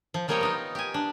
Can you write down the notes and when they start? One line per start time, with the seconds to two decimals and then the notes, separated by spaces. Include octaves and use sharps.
0.14 F3
0.28 F3 G3 A#3 C#5 D#5 G5
0.41 B3 D#4 F4
0.75 G4 G#5
0.94 D4